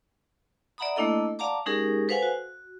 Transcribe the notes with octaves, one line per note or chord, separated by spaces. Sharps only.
D5 E5 F#5 A#5 B5 D#6
A3 A#3 D4 E4 A4 D#5
D5 F5 F#5 A5 A#5 D6
G#3 C#4 D#4 G4 G#4 A#4
A4 B4 C5 F5 F#5 G#5
F#4